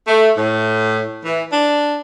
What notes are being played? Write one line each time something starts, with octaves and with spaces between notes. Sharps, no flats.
A3
A2
E3
D4